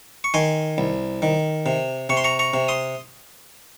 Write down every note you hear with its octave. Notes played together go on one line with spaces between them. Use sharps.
C#6
D#3 G#5 C6
C2
D#3
C3
C3 C#6
C6
A#5 C#6
A#5 C#6
C3
C6 D#6